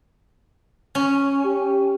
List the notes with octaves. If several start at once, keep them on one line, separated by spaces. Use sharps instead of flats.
C#4
G4